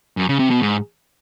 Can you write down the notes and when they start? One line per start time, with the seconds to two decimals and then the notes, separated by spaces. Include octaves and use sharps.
0.17 F#2
0.28 C#3
0.39 C3
0.51 B2
0.62 G#2